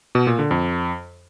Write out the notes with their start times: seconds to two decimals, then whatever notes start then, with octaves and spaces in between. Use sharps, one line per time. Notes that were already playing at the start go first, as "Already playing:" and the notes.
0.15 B2
0.27 A#2
0.39 D3
0.51 F2